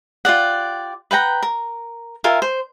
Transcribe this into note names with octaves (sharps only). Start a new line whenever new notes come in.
F4 G4 D5 F#5
B4 F#5 G5 A#5
A#4
F4 A#4 E5 G#5
C5